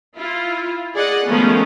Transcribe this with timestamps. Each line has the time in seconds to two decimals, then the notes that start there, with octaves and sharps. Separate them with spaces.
0.16 E4 F4
0.95 G#4 D5 D#5 F#5
1.27 D#3 F3 G#3 A3 B3 C#4